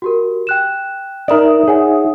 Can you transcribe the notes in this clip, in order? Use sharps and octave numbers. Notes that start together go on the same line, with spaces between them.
F#4 G4 A#4
G5 F#6 E7
D#4 A#4 D5 E5 D#6
G#4 C#5 F#5 G#5